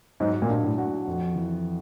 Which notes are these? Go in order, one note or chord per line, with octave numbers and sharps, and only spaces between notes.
G#2 F#3
A#2
D4
A2
F#4
F2
E3